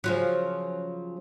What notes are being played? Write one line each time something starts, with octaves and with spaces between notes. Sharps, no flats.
C#3 F3 F#3